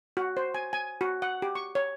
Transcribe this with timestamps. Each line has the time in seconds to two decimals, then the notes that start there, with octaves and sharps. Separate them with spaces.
0.17 F#4
0.37 C5
0.54 G#5
0.73 G#5
1.01 F#4
1.22 F#5
1.42 G4
1.55 C#6
1.75 C#5